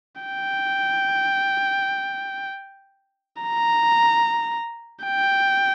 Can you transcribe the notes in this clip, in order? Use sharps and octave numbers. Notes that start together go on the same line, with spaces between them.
G5
A#5
G5